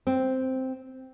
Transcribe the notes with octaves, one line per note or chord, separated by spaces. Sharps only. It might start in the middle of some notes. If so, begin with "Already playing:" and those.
C4